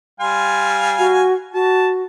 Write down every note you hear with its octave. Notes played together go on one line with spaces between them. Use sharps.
G3 F5 G#5 C6
F#4
F#4 A5